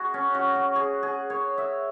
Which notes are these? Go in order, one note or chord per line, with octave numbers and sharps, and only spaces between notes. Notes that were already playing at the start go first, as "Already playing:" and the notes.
Already playing: F#4 G#4
C#4
F#4
F#4
G#4
G#4
C#5
E5